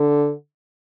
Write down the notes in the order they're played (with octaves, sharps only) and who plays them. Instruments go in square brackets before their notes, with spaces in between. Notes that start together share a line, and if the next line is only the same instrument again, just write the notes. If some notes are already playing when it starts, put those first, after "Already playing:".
Already playing: [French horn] D3